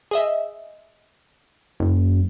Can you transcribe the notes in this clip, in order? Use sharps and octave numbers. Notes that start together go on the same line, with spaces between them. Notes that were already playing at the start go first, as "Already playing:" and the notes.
G#4 D#5 E5
F#1